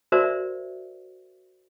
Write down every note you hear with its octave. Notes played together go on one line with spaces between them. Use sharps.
F#4 A#4 C5 D5 E5